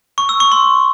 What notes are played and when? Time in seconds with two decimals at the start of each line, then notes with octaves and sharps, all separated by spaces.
0.18 C#6
0.29 E6
0.40 C#6
0.52 C6